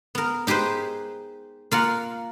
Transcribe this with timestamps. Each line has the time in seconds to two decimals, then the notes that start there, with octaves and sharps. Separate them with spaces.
0.15 B3 A#4
0.47 D#4 G4 G#4 B4 C5
1.71 A#3 F4 A#4 F#5